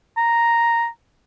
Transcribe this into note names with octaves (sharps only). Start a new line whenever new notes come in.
A#5